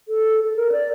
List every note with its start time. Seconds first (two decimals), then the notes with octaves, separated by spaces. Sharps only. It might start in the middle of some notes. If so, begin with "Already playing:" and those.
0.08 A4
0.44 A4
0.56 A#4
0.72 D5